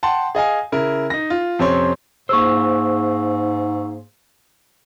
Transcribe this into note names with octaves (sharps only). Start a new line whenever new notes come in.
F#5 G5 A5 C6
G#4 D#5 F5 G#5
C#3 E4 A#4
D#4 A#6
F4
F2 C3 C4 C#4 C#5 C6
G#2 A#3 G#4 C5 C#6 E6